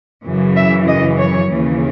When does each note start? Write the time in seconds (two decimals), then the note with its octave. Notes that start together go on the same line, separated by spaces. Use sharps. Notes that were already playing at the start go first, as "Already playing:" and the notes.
0.24 F#2 C#3 E3
0.56 E5
0.87 D#5
1.18 C#5
1.49 D#2 C#3 E3